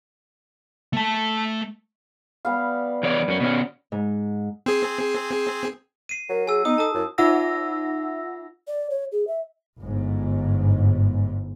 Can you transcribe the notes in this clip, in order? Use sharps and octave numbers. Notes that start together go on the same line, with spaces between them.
A3 A5
G3 B3 F5
E2 C#5 D5
F#2 C#4
B2 C#4
G#2
C4 G#4
C7 D#7
F#3 A#4
G#4 G#5 E6
B3 D#4 D#6
A4 A5 D#6
F#2 E4
D#4 F4 E5 F#5 E6 A#6
D5
C#5
G#4
E5
G1 G#2